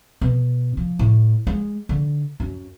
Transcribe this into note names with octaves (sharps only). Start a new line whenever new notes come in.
B2
F3
A2
G#3
D3
F#2